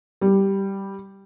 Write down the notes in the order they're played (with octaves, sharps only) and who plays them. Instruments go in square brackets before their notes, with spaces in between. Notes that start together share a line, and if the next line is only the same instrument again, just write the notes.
[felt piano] G3